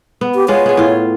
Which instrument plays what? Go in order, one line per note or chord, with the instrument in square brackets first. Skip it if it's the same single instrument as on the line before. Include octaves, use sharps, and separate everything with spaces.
[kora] B3
[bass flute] G4
[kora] G#3 B3 F4 [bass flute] C#5
[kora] B3 G#4
A2 F4